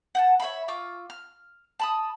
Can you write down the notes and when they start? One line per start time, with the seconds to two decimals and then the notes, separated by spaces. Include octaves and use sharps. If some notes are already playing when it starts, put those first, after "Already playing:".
0.15 F#5 G5 A5
0.40 C#5 E5 F5 B5
0.68 F4 C#6 D6 E6
1.10 F6
1.79 A5 B5 D#6